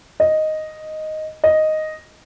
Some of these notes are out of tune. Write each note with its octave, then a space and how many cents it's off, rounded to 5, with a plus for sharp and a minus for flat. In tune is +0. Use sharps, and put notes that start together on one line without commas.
D#5 +0
D#5 +0